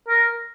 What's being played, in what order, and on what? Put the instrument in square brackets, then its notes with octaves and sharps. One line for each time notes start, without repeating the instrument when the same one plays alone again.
[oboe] A#4